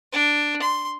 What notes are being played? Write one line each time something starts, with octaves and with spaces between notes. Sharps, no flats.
D4
C6